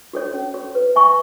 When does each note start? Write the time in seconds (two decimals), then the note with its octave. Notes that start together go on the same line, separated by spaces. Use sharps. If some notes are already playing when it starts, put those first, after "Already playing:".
0.13 F#4 A4 C#5
0.34 C#4
0.54 F#4 A4 C#5
0.75 B4
0.95 E5 G#5 C#6